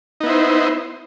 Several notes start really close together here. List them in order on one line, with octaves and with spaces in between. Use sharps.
D#4 B3 E4 C5